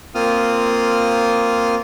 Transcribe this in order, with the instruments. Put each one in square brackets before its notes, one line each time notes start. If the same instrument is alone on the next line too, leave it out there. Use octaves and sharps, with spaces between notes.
[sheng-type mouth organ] A#3 C4 F4 D#6 F6